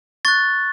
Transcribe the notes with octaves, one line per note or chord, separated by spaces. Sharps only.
C#6 F#6 A6